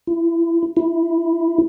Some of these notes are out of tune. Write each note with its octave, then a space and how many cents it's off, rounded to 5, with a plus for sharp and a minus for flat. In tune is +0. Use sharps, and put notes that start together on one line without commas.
E4 +25
E4 +0